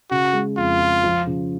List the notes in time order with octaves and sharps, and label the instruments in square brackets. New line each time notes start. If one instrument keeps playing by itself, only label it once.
[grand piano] C#3 [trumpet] F#4
[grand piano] G#3
[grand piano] F2 [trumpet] F4
[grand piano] F3
F3
C#3